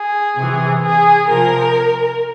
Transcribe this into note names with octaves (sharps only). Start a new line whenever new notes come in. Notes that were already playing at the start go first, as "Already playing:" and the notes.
Already playing: G#4
C3 E3
G#4
C3 F3 A#4